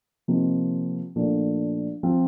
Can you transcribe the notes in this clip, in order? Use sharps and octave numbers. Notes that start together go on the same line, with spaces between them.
C3 F3 A#3 D#4
A#2 F3 A3 D4
F3 C4 F4